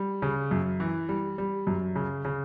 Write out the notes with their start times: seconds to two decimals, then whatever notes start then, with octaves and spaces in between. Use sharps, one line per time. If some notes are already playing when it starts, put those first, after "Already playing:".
Already playing: G3
0.22 C#3
0.51 F#2
0.80 E3
1.09 G3
1.38 G3
1.67 F#2
1.96 C#3
2.25 C#3